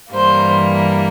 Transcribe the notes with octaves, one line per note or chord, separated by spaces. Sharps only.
G2 E3 G3 A#3 C5